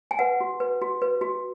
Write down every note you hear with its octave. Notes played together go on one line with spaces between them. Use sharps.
G#5
B4 F#5
F#4
B4
F#4
B4
F#4